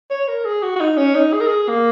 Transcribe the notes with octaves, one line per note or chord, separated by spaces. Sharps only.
C#5
A#4
G#4
F#4
F#4
D#4
C#4
D#4
G#4
A#4
G#4
A#3